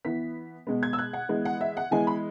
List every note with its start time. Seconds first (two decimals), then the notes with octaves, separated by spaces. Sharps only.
0.05 E3 B3 B6
0.67 B2 G#3 B3
0.83 G#6
0.93 E6
0.98 F#6
1.13 F#5
1.29 E3 G#3 B3
1.45 F#5
1.61 E5
1.77 F#5
1.91 E3 G#3 B3 G#5
2.07 B5